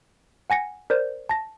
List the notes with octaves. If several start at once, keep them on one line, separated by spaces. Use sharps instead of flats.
F#5 G#5 A#6 C#7
A#4 C5 D5 G6
A5 A#6